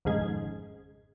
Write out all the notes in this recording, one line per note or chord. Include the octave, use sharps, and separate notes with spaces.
G#1 F2 C#3 G#3 G#6